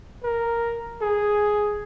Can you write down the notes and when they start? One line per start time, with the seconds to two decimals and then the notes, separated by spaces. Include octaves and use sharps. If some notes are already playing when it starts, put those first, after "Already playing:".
0.23 A#4
1.02 G#4